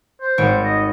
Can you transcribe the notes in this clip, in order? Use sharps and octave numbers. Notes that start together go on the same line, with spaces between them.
C5
G#1 C#5 D7
D#5